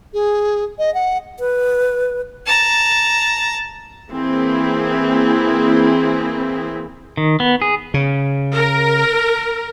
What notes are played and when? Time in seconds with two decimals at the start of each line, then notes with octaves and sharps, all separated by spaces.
0.13 G#4
0.79 D#5
0.94 F#5
1.40 B4
2.46 A5 A#5
4.10 E3 A#3 C4 E4 G#4
7.17 D#3
7.40 B3
7.62 G#4
7.94 C#3
8.55 A#4